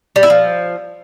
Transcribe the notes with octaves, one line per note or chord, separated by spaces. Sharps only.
G3
E4
F3